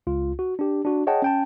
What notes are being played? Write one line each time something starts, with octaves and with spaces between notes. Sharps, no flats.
C#2 F4
F#4
D4 G4
D4 F#4
G#4 C#5 D#5 F#5 G5 A5
C#4 G5 A5